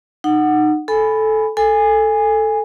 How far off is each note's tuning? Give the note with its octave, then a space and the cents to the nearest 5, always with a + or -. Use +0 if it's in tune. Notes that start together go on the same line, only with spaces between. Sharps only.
D#4 -25 F#5 +0
A4 -10 G#5 +0 B5 +5
A4 +0 G#5 -15